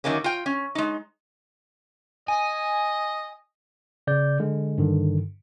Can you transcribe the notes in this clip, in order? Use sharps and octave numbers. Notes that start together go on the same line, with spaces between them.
F#2 D#3 F#3 A#3 C#4
F4 G5
C#4
G#3 D#4
D#5 G#5
C#3 D5 G6
D3 G#3
G2 D3 D#3